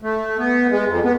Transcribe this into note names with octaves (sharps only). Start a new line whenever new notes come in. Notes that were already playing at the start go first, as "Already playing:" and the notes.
A3
B3
G#3
F2
B3